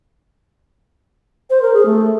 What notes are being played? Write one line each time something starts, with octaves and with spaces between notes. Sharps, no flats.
C5
A#4
G#4
A3